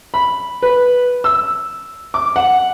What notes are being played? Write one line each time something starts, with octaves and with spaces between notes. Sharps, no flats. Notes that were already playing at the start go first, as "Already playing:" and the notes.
B5
B4
E6
D6
F#5